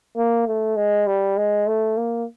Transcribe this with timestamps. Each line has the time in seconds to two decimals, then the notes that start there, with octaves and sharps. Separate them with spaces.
0.17 A#3
0.47 A3
0.76 G#3
1.07 G3
1.37 G#3
1.67 A3
1.97 A#3